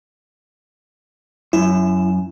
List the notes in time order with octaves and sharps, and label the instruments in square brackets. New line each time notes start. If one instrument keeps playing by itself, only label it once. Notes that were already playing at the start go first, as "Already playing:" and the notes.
[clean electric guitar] F#2 [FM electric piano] E4